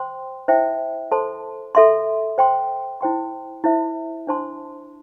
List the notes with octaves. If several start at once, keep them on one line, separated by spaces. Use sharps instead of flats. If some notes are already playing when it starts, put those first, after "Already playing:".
Already playing: C5 G5 C6
E4 C5 E5 G5
A4 C5 A5 C6
A4 E5 C6
C5 G5 C6
E4 C5 G5 C6
E4 C5 E5
D4 C5 A5 C6